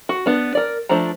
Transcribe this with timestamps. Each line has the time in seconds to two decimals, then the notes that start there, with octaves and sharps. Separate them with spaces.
0.09 F#4
0.26 B3 D4
0.55 A#4 D5
0.89 F3 A3 D4 C5 A#5